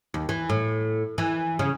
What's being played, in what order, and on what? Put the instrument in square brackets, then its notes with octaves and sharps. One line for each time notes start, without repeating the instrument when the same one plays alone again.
[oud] D#2
E3
A2
E3
C#3